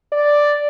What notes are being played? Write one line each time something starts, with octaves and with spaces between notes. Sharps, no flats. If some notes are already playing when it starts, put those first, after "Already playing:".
D5